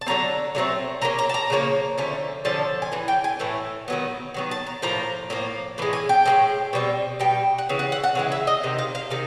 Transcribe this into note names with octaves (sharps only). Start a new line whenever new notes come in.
A5
D3 F#3 A3 C4 A#5
D3 F#3 A3 C4
C#3 F3 A#3 C#4 A#5
A#5
A5
A#5
C#3 F3 A#3 C#4
D3 F3 A3 C#4
D3 F3 A3 C#4 A5
G#5
A2 E3
G5
G#5
A2 E3 A3
D#3 F#3 B3
D#3 F#3 B3
A5
A#5
A2 F3 A#3 A#5
A2 F3 A#3
A2 E3 G#3
G#5
G5
A2 E3 G#3
B2 G3 C4
B2 G3 G5
F#5
C#3 E3
F#5
F#5
F#5
C#3 E3 G#3
E5
D#5
C3 D#3
F5
F5
C3 D#3